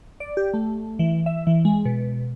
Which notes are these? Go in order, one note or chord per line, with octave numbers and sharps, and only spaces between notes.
D5
G4
A3
E3
E5
E3
G#3
B2